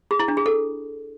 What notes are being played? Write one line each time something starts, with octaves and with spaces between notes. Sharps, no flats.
G#4
E4
D4
G#4
A4